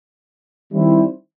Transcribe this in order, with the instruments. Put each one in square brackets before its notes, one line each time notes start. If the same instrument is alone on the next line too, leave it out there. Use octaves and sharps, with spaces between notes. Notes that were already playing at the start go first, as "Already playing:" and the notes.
[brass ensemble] D#3 G3 C4 E4